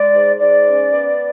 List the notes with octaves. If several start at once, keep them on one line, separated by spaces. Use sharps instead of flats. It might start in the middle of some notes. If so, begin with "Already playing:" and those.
Already playing: G#3 D5
G#2
G#2 D5
C#4
B3